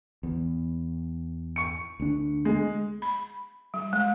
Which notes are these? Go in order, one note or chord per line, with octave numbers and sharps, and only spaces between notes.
E2
C#6 C#7
D2 D4
G#3
B5
G3
G#3